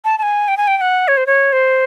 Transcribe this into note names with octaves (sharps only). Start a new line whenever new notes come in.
A5
A5
G#5
G5
G#5
G5
G5
F#5
C#5
C5
C#5
C5